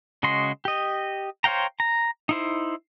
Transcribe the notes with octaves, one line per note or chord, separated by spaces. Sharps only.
C#3 G#3 F#4 D#5 C6
G4 D#5
C5 C#5 F5 G5 A#5
A#5
D#4 E4 C5